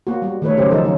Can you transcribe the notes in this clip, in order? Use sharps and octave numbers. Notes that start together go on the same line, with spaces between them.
A#3 F#4
G3 F#4
D#3 A3 B4 C#5
C#3 F#3 C#4 G4 C5
D#3 F3 D#4 A4 A#4 C5
D#3 F#3 C#4 D#4